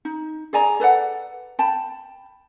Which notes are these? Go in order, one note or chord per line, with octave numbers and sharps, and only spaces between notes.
D#4
G#4 D5 G#5 A#5
A4 B4 D5 F#5
G5 A5 B5